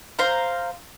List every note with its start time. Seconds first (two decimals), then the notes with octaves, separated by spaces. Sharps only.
0.19 C5 F5 A#5